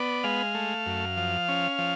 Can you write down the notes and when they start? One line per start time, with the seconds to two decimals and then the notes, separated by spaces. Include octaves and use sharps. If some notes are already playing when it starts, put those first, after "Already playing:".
Already playing: B3 D5
0.24 G#3 F5
0.55 A3
0.86 F#2
1.17 F3
1.49 C#4
1.79 F3